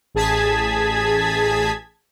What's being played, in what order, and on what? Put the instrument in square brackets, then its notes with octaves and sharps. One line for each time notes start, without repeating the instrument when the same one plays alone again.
[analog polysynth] A1 G#4 A5 G#6 B6